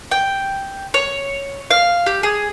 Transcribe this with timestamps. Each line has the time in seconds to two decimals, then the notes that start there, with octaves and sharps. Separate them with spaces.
0.11 G5
0.94 C#5
1.71 F5
2.06 G4
2.23 G#4